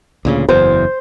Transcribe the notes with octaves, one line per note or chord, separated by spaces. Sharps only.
D2 A#2 C#3
F#1 E2 C5